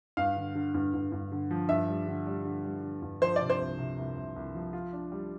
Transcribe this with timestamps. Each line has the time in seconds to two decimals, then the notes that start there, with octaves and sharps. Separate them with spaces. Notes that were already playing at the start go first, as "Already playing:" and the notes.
0.17 G2 F5
0.37 D3
0.55 D3
0.75 G2
0.94 G2
1.12 G2
1.32 D3
1.51 F3
1.69 G2 E5
1.88 G3
2.07 D3
2.26 G3
2.45 D3
2.65 G3
2.83 D3
3.02 G2
3.22 F3 C5
3.36 C3 D5
3.49 C5
3.60 C2
3.79 C3
3.98 C2
4.16 C2
4.36 C2
4.55 F3
4.73 F4
4.93 D4
5.12 G3